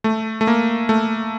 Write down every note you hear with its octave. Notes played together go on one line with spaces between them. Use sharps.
A3
A3
A#3
A3